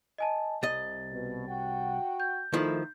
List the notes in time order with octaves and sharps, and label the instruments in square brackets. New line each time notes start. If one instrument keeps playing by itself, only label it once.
[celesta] D#5 G#5 A5
[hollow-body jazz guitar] C2 D#5 [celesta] A6
[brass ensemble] B2
F#4 F#5 G5
[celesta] G6
[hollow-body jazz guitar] D#3 F3 E4 [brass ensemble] A3